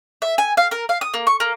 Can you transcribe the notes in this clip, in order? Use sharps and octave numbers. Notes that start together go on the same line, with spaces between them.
E5
G#5
F5
A#4
F5
D#6
A#3
C#6
A#3